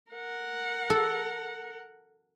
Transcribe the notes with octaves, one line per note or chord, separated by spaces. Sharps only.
A#4 F#5
A4